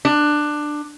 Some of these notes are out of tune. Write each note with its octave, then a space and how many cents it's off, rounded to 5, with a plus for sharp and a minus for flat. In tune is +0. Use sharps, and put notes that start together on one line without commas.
D4 +15